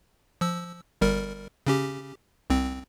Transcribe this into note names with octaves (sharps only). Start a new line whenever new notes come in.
F3 E6
G1 G3 A#4
C#3 C#4 G4
C2 C4